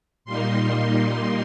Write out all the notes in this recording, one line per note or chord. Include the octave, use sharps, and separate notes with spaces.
A#2 G3 A#3 D#4 C6
C6